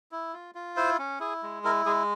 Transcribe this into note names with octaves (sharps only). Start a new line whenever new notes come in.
E4
F4
F4
E4 C5
C#4
E4 G#4
G#3
E4 A#4
G#3 G#4